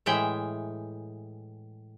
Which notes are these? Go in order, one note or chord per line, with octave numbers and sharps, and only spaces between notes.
A2 E3 G#3 E5 G5